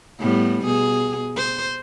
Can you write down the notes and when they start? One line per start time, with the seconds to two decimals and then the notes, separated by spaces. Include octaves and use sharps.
0.19 A2 G3 B3
0.64 B2 G#4
1.36 C5